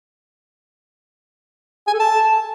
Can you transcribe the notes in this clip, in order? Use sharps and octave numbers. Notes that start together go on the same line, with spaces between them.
G#5
A4
A5